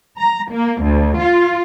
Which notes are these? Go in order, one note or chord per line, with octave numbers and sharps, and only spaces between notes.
A#5
A#3
D2
F4